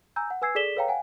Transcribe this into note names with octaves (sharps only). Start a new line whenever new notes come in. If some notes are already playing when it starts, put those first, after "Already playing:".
G#5 A#5 E6 G6
F#5
B4 G#5 E6 G#6 C7
G#4 A4 D5 B6 E7 G7
A4 B4 C#5 F5 G5 A#5
F5 F#5 G#5